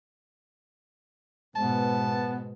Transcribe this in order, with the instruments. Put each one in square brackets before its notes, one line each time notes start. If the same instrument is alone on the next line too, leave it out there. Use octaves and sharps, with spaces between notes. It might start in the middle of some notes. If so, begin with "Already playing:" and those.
[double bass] G#2 B2 [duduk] B3 [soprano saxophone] A5